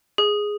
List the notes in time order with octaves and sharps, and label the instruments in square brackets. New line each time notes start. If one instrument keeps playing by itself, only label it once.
[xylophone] G#4